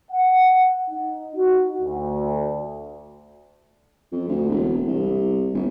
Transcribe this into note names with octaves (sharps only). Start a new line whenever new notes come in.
F#5
D#4
F#4
D2
F2
D2
E1
C2
G1